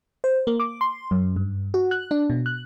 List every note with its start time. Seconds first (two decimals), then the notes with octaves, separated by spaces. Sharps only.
0.24 C5
0.47 A#3
0.60 D6
0.81 C6
1.11 F#2
1.36 G2
1.74 F#4
1.91 F#6
2.11 D4
2.30 B2
2.46 F#6